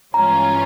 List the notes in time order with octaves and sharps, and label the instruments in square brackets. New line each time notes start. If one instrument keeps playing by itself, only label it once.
[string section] G2 E3 G#3 C#4 F4 [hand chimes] A#5